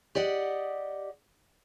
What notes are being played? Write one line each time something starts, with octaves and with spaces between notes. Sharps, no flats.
G4 D5 D#5 F#5